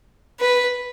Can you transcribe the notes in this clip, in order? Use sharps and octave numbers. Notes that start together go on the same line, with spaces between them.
B4